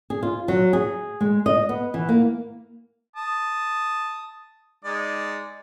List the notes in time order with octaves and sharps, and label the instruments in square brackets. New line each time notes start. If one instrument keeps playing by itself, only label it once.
[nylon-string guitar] G#4
F4
F#3
G#4
G#3
D#5
B3
E3
A#3
[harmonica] A5 D#6
G#3 D#4 D5